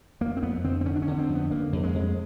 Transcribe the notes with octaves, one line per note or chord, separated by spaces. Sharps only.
F2 A#3
C4
F2 B3
D3 C4
C4
D3 C#4
D4
C#4
D3
C4
F2
B3
F2 A#3
F2
G#3
F2